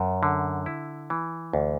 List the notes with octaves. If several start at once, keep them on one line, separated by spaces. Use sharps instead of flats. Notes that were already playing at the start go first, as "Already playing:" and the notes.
Already playing: F#2
D3
E4
E3
D2